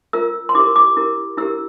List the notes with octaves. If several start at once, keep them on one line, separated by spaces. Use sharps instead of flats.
F4 A#4 E6
C6
E4 G4 A#4 D6
D6
E4 G4 A#4
E4 G4 A#4 E6